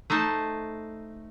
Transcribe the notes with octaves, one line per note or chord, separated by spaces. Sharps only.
A3 D#4 C5 A5